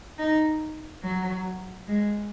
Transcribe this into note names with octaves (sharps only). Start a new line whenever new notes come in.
D#4
F#3
G#3